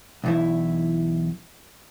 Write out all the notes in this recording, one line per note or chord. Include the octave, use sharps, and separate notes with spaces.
B1 E2 E4